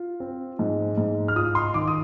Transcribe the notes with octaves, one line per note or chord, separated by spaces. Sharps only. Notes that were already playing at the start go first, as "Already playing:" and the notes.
Already playing: F4
C4
G#2
G#2
F6
F4 D#6
C6
D#3 D6
D#6